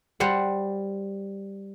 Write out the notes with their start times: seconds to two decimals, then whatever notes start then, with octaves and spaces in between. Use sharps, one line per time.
0.20 G3 C5 F#5